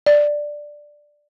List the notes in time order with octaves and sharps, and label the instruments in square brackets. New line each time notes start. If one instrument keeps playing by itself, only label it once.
[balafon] D5